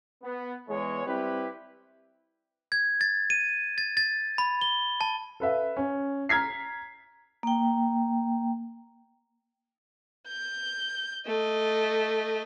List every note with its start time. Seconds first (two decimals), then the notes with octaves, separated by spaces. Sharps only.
0.23 B3
0.69 E2 G#3 C#5
1.06 G3 C4 E4 G4 B4
2.72 G#6
3.01 A6
3.30 D#7
3.78 A6
3.97 A6
4.38 B5
4.61 G7
5.01 A5
5.40 A4 B4 E5 F5
5.77 C#4
6.29 A#5 F6 G#6 B6 C7
7.43 A#3 G5
10.28 G6
11.26 A3 D#5